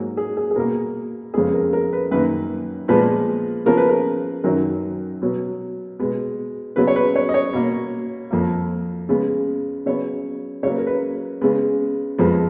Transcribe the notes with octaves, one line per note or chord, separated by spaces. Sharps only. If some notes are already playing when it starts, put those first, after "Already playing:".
Already playing: G#2 F#3 A#3
G#4
G#4
G#4
B2 A#3 A#4
F2 C#3 G#3 B3 G#4
A#4
A#4
B4
F#2 D#3 A#3 B4
A#2 F3 G#3 B3 B4
C#3 F3 B3 A#4
B4
A#4
F#2 D#3 F#3 A#4
B2 F#3 B3
B2 G#3 B3
C#3 F#3 B3 B4
C#5
B4
C#5
D#5
C#5
B2 A#3
F2 F3 A#3
C#3 G#3 B3
C#3 F#3 B3 C#5
C#3 F#3 A#3 B4 C#5
A#4
B4
C#3 G#3 B3
F2 F3 G#3 B3